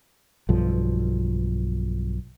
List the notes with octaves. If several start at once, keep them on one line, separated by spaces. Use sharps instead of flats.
B1 G2 F3